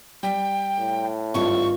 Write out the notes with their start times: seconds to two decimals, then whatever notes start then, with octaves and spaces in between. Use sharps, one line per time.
0.23 G3 G5 B6
0.79 A2
1.34 G#1 G2 F4 C#6